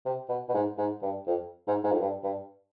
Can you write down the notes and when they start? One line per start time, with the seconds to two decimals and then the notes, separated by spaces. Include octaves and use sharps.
0.05 C3
0.29 B2
0.49 B2
0.54 G#2
0.78 G#2
1.02 G2
1.27 F2
1.68 G#2
1.83 G#2
1.91 F2
2.00 G2
2.24 G2